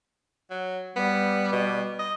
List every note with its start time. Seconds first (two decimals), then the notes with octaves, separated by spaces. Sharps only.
0.50 F#3
0.96 G3 B3
1.52 B2
1.99 D#5